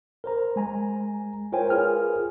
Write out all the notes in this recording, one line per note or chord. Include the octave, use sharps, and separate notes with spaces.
A#4 C5 A#5
G#3 G#5 A#5
F4 A#4 C5 C#5 G5 G#5
F4 G#4 A#4 B4 G#5 F6